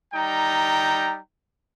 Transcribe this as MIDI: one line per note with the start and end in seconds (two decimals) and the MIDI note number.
0.14 1.19 55
0.14 1.19 63
0.14 1.19 79
0.14 1.19 82